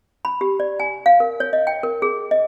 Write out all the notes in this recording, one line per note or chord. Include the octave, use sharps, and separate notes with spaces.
B5
G4
D5
G#5
F5
A#4
C#5
D#5
G5
A#4
G#4
D#5